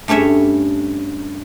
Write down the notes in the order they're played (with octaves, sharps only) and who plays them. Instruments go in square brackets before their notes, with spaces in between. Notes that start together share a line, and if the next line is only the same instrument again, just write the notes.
[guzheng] G2 A3 C#4 C#5 E5